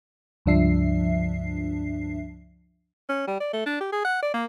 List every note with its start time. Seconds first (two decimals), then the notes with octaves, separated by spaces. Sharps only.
0.46 C#2 G2 F3 D4 E5 C7
3.09 C#4
3.27 G3
3.40 D5
3.53 A3
3.66 D4
3.81 G4
3.92 G#4
4.05 F#5
4.22 D5
4.34 A#3